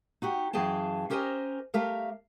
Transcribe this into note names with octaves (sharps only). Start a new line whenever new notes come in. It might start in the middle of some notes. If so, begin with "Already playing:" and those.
D#4 F#4 G4
F#2 E3 G#4 F5 G5 A5
C#4 G4 A#4 C5 D#5 G#5
A3 G4 A#4 E5 F5